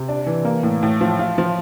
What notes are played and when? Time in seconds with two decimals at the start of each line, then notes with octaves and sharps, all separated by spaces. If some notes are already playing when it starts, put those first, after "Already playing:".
Already playing: C3
0.09 D4
0.26 E3
0.45 A#3
0.63 A2
0.83 A2
1.01 F3
1.19 F4
1.38 F3